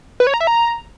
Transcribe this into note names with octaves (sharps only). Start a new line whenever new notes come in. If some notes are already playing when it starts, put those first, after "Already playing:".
B4
C#5
A#5
E5
A#5